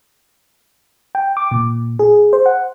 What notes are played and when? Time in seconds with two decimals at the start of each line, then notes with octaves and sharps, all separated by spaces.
1.15 G5
1.37 D6
1.51 A#2
1.99 G#4
2.33 C5
2.46 F#5